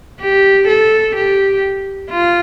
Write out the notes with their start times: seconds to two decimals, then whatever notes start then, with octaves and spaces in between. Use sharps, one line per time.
0.21 G4
0.68 A4
1.16 G4
2.11 F4